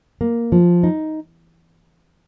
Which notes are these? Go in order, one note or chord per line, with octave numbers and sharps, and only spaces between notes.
A#3
F3
D#4